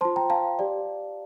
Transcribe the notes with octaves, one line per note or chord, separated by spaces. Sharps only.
F4 C5 A5 C6
G5 A#5
F5 A5
G4 D5